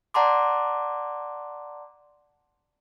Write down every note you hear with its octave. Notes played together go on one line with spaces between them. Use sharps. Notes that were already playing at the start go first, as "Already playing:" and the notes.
D5 F#5 A5 A#5 C6 D6